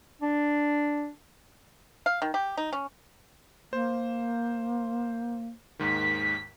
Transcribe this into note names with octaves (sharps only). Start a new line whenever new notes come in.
D4
F5
D#3
G4
D#4
C#4
A#3 C5
D#2 G#2 D#3 B6